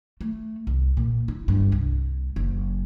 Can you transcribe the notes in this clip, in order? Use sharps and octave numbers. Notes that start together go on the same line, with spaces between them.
A3
C2
A#2
E4
G2
C2
F#1